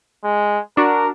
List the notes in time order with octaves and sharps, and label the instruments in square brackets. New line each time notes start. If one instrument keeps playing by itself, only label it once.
[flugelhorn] G#3
[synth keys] D4 F#4 [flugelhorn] A#4